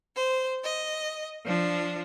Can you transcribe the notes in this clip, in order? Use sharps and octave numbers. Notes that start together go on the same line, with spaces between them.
C5
D#5
F3 D4